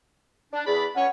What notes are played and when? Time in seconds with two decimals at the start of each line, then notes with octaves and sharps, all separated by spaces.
0.53 D4
0.67 E2 G#4 D5 B5
0.96 C#2 C#4 C#5 F#5